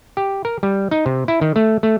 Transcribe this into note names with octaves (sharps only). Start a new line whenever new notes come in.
G4
A#4
G3
D#4
C3
E4
D#3
A3
A3